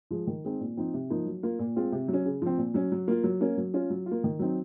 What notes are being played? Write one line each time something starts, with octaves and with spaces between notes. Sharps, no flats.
F3 G#3
D#3
G#3 C4 D#4
A#2
F3 C4 D#4
C3
F3 A#3 D#4
F#3
A#3 F4
A#2
G#3 C4 F4
C3
F#3
C#4
C#3
F3 C4
A#2
F#3 C#4
F#3
A#3 F4
F#3
A#3 C#4
F#3
C#4 F4
F#3
F4
A#3
D#3
F#3 C4 D#4